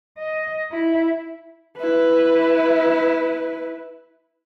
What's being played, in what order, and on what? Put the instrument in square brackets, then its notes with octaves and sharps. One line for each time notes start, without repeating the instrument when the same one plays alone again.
[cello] D#5
E4
[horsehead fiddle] E4 B4